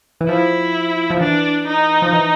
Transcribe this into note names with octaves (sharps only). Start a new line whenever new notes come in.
E3
F3 E4
F3
E3 D4
D#4
F3
E3